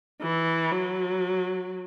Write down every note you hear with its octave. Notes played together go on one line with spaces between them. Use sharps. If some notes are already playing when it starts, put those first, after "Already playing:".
E3
F#3